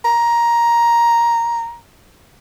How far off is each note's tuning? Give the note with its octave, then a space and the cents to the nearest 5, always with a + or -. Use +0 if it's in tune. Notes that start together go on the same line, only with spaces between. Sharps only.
A#5 +10